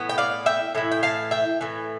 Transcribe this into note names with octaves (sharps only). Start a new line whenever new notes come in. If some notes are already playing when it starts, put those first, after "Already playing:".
Already playing: A2 E3 B3
G5
D5 F5
E5 G5
A2 E3 E4
G5
F5 A5
E5 G5
A2 E3